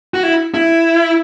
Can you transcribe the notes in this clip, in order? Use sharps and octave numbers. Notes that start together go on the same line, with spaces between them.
F#4
E4
E4